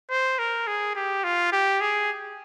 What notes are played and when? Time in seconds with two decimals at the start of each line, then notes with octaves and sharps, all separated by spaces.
0.10 C5
0.39 A#4
0.67 G#4
0.95 G4
1.24 F4
1.52 G4
1.81 G#4